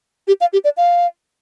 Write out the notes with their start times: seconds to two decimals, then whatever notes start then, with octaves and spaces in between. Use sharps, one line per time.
0.28 G4
0.41 F5
0.53 G4
0.64 D5
0.77 F5